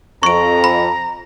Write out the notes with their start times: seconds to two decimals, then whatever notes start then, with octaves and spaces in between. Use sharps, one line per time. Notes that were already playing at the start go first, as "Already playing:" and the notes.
0.23 F2 A#5 C#6 D7
0.64 B5